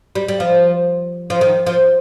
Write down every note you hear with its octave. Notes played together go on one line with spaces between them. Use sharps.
G3
G3
F3
F3
D#3
F3